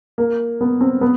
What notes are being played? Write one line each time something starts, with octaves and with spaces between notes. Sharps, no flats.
A#3
B3
C4
B3